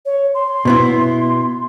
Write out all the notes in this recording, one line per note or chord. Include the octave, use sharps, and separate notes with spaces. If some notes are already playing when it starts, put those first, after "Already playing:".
C#5
C6
B2 B3 E4